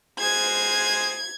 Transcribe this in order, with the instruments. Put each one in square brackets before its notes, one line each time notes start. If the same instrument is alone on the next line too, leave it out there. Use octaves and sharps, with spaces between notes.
[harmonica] G#3 G#4 C5 [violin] G#6